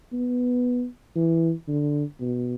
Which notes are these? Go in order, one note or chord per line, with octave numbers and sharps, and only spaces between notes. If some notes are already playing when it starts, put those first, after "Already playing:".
B3
E3
D3
B2